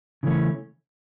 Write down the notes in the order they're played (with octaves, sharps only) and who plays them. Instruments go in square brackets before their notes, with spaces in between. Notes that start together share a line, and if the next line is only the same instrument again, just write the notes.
[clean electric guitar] C#3 E3 A3 C#4